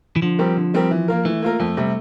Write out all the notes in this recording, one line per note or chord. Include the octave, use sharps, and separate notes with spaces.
E3
D3 F3
G3 C4 G4 A#4
D3
G3 C4 G4 A#4
E3
A#3 F4 A#4
E3 A3
A#3 F4 A#4
F2 A3
C3 G3